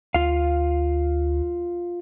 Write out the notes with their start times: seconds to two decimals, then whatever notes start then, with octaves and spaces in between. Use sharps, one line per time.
0.14 D2 F4 F5